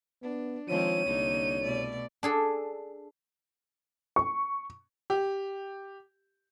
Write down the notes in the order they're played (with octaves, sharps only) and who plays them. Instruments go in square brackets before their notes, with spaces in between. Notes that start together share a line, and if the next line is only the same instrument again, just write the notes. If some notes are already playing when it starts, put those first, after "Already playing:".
[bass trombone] B3 [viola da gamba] D4
[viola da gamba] D#3 G#3 C4 [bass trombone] F3 [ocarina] C#5 [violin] D#7
[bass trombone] C2 [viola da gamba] D3 A#3 D#4
[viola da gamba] B2 A3 D5
[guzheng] D4 G#4 A4
[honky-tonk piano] C#6
[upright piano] G4